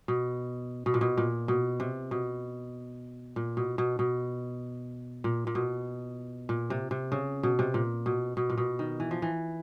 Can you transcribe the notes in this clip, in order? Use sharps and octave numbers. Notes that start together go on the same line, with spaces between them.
B2
B2
A#2
B2
A#2
B2
C3
B2
A#2
B2
B2
B2
A#2
A#2
B2
A#2
C3
C3
C#3
B2
C3
A#2
B2
B2
A#2
B2
D#3
E3
F3
E3